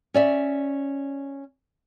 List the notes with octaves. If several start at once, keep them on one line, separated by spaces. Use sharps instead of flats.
C#4 D5 E5